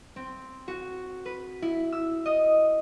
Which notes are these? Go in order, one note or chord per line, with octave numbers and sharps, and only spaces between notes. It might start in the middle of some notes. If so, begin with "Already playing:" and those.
C4
F#4
B4
E4
E6
D#5